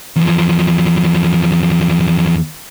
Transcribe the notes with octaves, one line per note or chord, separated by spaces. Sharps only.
E2 F3